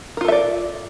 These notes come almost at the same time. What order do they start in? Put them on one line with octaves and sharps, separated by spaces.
A#4 F4 A4 E5 D5